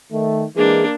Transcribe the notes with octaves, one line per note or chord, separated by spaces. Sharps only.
D#3 A3
E3 G#3 A#3 D4 G#4